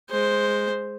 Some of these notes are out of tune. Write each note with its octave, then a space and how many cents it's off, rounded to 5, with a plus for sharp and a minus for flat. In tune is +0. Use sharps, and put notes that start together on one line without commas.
G#3 +0 C5 +0